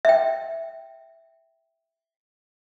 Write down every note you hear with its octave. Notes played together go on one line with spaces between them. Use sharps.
E5 G5